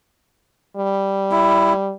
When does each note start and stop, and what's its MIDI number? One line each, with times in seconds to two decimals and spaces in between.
0.76 1.93 55
1.31 1.73 64